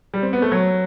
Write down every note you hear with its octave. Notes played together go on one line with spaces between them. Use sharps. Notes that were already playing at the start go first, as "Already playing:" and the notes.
G3
C4
B3
A3
F#3